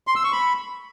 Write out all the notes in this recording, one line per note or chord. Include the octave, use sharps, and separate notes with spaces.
C6
E6
C#6
B5